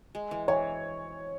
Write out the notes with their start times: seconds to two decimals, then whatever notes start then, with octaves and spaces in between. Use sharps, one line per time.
0.15 G#3
0.31 E3
0.48 E3 C#5